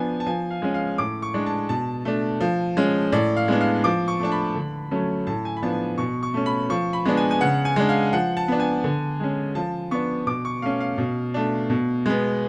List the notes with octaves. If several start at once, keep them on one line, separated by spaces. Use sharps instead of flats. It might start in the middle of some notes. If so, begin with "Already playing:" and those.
Already playing: F3 B3 D4 G#5
A5
F3 G#5
F5
G#3 C#4
F5
A2 D6
C#6
G#3 D4
A5
B2 A5
A3 D4
F3
G#3 C#4
A2 D5
F5
G#3 B3 D4
F5
F3 D6
C#6
A3 D4 A5
B5
D3
F#3 A3 C#4
A2 A5
G#5
B5
F3 B3 D4 A5
B2 C#6
C#6
A3 C#4
B5
F3 C#6
B5
G#3 B3 D4
G#5
G#5
C#3 F#5
G#5
G#3 D4
F5
F3 F#5
A5
B3 D4
G#5
D3
G#3 C#4
F3 A5
B3 D4 C#6
B2 D6
C#6
A3 C#4 F5
F5
B2
A3 D4
B2
G#3 B3